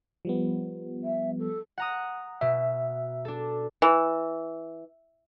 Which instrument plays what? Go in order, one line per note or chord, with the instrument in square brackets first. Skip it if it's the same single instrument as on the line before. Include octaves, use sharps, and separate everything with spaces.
[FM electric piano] F3 G3 B3
[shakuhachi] E5
A4
[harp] F#5 A#5 D#6
[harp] B2 [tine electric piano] E5
[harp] D4 A4
[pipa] E3